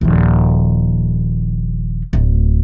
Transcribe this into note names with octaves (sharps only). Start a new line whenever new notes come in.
D#1 F3
D1